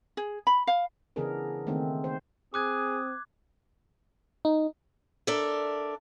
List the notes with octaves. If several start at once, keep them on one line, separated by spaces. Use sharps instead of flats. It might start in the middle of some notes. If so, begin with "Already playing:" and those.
G#4
B5
F5
C#3 E3 B3 D4 G#4 A#4
D#3 A3 A#3 C4
C5
C4 G#4 D6 D#6 F#6 G#6
D#4
D4 A4 A#4 D5 E5